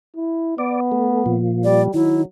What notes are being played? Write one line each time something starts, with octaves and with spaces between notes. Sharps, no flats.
E4
B3 D5
A3
A#2 F3
G3 D5
D#3 F#3 E4